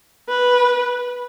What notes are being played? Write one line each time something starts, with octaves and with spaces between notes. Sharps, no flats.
B4